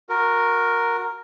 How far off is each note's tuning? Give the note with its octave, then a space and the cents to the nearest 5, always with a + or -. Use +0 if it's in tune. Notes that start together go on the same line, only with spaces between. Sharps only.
F#4 -20 A#4 +0